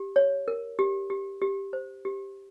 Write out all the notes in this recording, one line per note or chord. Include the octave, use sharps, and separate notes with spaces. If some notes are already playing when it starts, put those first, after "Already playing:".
Already playing: G4
C#5
A#4
G4
G4
G4
C5
G4